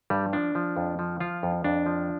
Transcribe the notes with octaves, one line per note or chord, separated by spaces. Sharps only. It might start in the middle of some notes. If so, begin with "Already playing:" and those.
G2 G3
F3 D4
F3
F2
F3
F3 F4
F2
F2 D4
F3